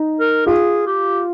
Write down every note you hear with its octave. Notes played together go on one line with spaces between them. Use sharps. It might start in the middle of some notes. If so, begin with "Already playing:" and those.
Already playing: D#4
A#4
F4 G#4
G4